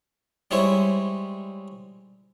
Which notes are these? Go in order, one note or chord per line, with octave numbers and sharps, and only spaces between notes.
G3 G#3 E4 C5 C#5 E5